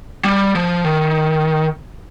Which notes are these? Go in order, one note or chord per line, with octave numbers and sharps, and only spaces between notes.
G3
F3
D#3